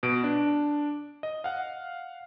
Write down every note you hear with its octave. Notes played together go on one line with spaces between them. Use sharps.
B2 D7
D4
D#5
F5 F#5